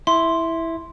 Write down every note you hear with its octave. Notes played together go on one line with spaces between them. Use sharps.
E4 C6